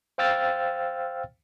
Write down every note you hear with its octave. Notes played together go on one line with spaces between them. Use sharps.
C5 F5 G5 E6 F6 A6